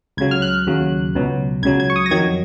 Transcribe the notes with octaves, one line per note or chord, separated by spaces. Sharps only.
C#2 C#3 F#3 G#6
F6
F#6
D#2 C#3 F#3
C#2 B2 F#3
C#2 C#3 F#3 G#6
G#6
C#6
D#6
A#6
F2 D#3 F#3 G#6